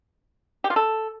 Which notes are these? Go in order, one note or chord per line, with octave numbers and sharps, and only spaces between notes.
G4
F4
A4